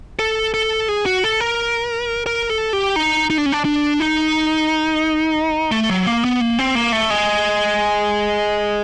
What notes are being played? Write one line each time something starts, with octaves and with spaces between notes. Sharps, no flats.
A4
A4
G#4
F#4
A4
A#4
A#4
A4
G4
D#4
D#4
D4
C#4
D4
D4
D#4
A3
F#3
A#3
B3
A#3
C4
A#3
A3
G#3